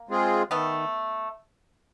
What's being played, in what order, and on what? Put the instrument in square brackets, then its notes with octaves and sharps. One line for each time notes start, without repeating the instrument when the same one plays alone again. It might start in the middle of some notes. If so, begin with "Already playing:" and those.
Already playing: [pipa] A#3
[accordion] G#3 C4 F4 G#4
[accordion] D#3 [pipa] A3 B3